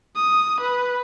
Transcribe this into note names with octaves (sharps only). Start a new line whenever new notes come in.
D#6
B4